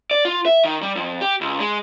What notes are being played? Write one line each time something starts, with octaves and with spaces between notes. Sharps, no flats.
D5
F4
E5
D#3
G3
F2
G4
C#2
G#3